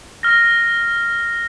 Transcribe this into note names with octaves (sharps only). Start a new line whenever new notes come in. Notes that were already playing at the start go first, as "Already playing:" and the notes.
F6 A#6